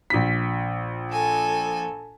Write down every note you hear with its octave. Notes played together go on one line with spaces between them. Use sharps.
A#1 B6
A4 G#5